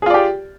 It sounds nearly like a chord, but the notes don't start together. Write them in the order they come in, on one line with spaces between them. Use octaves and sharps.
G#4 F4 D5 G4